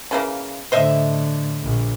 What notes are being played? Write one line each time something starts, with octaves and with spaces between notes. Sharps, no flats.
C#3 E3 A#3
A2 D3 C5 D#5 E5
A#1